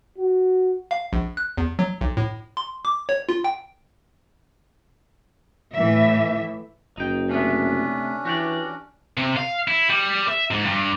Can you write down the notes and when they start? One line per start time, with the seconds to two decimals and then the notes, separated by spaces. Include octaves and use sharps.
0.18 F#4
0.91 F5
1.13 A#1
1.37 F#6
1.57 E2
1.79 F#3
2.01 B1
2.17 A2
2.57 C6
2.85 D6
3.09 C#5
3.29 F4
3.44 G5
5.75 A2 E3 E5
6.97 F#1 D#4 G5
7.29 C3 A3 B3 C#4 D4
8.25 E3 F#4 G4 D5
9.17 C3
9.37 F5
9.68 E4
9.90 G3
10.28 E5
10.51 G#2
10.66 G2